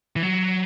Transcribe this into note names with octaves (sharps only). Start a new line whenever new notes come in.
E3
F#3